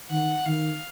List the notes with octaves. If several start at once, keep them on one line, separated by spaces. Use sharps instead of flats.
D#3 F#5
D#3 F5